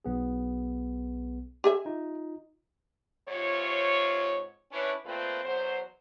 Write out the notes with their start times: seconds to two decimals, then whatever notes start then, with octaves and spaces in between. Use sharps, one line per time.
0.05 B1 B3 G#4
1.64 G4 G#4 E5
1.85 D#4 F4
3.29 G#2 C3 F4 C#5
4.73 C#4 D4 E4 B4 C#5
5.05 A#2 A3 C4 F4 B4 C5
5.44 E2 B2 F#3 C5